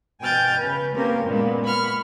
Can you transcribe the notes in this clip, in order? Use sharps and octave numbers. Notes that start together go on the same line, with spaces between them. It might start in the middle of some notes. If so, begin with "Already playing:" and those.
B2 G5 G#5 F6 G6 A6
C#3 B4
A#3 C4 C#4 G4 A#4
A#2 G#3 A#3 B3
B5 C#6 F6